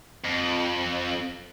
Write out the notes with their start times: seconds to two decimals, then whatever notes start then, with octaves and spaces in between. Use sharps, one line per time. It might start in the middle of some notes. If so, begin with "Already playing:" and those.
0.25 F2